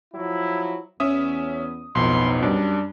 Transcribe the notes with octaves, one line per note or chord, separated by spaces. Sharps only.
F3 F#3 E4
E2 C#4 E5 D#6
B1 F2 A2 B3 D#4 C6
F#2 G3 D4